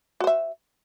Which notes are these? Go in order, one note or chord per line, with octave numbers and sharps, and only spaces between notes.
F#4 C5 E5